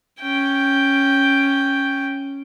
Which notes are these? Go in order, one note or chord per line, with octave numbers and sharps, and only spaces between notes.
C#4 G5